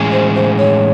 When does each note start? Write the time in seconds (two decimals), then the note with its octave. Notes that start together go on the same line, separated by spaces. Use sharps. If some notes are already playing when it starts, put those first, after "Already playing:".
Already playing: A2 E3 G#3 C#4 G#4
0.12 C5
0.35 C5
0.58 C#5